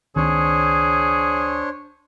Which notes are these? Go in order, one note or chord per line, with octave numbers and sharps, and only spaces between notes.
C#2 D#3 C4 D4 G#4 C5 C#5